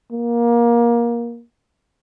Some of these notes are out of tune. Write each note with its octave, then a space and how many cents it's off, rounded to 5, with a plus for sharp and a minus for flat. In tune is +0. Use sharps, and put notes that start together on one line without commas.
A#3 +20